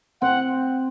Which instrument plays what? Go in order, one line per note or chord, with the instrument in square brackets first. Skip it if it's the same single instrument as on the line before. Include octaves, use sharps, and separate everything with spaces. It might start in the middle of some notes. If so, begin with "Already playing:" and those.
[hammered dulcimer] C4 [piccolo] F#5